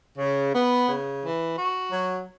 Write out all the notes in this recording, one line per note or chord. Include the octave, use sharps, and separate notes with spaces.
C#3
B3
C#3
E3
F#4
F#3